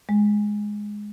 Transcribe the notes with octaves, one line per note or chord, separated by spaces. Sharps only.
G#3